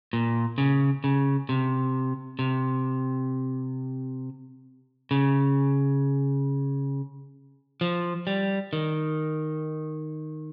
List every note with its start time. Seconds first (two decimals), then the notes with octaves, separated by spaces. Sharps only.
0.13 A#2
0.58 C#3
1.04 C#3
1.49 C3
2.39 C3
5.11 C#3
7.81 F3
8.27 G3
8.73 D#3